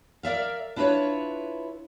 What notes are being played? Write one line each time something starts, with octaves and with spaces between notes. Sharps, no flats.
A#4 D5 E5 F5
D4 E4 F4 A#4 B4 C#5